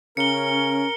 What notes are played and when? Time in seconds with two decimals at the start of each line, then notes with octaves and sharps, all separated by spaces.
0.17 C#3 C#4 A#4 C#7 G7